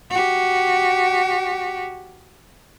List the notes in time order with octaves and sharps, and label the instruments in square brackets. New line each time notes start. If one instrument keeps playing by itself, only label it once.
[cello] F#4 G4